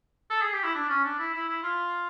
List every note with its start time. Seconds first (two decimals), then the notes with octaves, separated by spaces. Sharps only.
0.30 A4
0.42 G#4
0.53 G4
0.63 E4
0.75 D4
0.89 C#4
1.04 D4
1.19 E4
1.34 E4
1.49 E4
1.63 F4